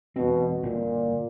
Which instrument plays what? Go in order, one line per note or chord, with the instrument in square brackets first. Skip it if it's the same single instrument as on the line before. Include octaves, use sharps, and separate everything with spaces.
[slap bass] E1 C4 [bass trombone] B2
[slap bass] G1 D3 A#3 [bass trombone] A#2